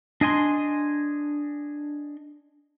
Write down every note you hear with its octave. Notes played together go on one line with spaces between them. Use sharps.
D4 D#5 G#5 C6